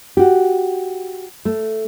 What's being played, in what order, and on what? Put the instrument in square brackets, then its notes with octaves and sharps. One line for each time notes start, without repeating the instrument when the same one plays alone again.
[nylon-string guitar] F#4 G4
A3